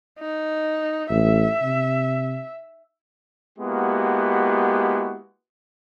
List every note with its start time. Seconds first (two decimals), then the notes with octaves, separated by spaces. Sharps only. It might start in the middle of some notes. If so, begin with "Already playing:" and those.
0.19 D#4
1.10 A1 E5
1.62 C3
3.59 G#3 A#3 B3 E4 F#4 G4